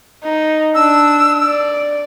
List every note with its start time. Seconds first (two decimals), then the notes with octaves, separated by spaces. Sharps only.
0.24 D#4
0.75 D4 E6
1.45 D5